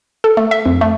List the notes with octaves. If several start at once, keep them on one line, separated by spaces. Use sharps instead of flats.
A4
A3
E5
F2
A3